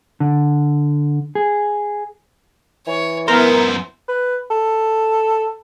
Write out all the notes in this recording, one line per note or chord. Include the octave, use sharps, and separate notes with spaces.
D3
G#4
E3 C#5
F#2 B3 E4 A#4 C5
B4
A4